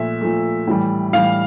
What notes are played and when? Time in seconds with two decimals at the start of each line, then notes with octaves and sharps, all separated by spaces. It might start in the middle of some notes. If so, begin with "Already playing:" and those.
Already playing: A#2 F3 A3 E5
0.21 A#2 F3 A3
0.67 A2 E3 G3
1.13 A2 E3 G3 F5